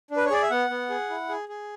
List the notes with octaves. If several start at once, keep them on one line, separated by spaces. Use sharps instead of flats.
D4
B4
C#5
G#4 D5
E5
B3 F#5
B3
G#4
E4
G#4
G#4